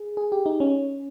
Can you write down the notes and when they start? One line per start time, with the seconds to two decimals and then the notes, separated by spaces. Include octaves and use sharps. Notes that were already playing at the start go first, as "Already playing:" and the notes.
Already playing: G#4
0.17 G#4
0.32 G4
0.46 D#4
0.60 C#4